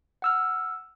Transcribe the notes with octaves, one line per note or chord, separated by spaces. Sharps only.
F#5 E6 F6